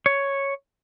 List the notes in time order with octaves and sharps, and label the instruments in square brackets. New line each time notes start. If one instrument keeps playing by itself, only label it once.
[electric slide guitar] C#5